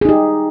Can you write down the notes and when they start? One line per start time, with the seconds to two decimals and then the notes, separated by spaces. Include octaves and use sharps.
0.01 G#4
0.05 D#4
0.09 G4